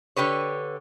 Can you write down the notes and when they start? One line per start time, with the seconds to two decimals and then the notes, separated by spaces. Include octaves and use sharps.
0.16 D3 G4 B4 C#5